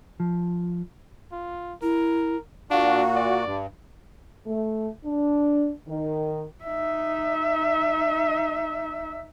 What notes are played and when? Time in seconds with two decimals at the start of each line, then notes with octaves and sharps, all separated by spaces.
0.20 F3
1.32 F4
1.82 E4 A#4
2.71 A#2 D4 F#4 F5
3.16 D5
3.45 G2
4.45 A3
5.04 D4
5.87 D#3
6.65 D#4 E5